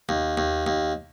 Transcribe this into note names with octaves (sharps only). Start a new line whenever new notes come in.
D#2
D#2
D#2